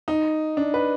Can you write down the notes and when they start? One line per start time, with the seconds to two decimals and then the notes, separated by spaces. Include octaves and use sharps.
0.08 D#4
0.57 D4
0.74 B4